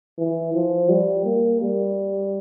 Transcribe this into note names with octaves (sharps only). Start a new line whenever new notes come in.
E3
F3
G3
A#3
G3